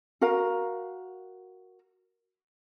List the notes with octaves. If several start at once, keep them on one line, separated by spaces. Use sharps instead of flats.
F#4 A#4 F5 A#5